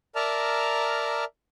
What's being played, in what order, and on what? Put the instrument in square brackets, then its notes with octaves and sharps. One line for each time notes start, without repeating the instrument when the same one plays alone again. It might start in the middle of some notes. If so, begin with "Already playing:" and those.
[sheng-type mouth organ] A#4 D5 E5 A5 A#5 F6